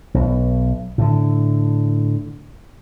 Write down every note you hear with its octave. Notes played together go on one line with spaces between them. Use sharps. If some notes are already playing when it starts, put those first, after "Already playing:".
B1
A2 D3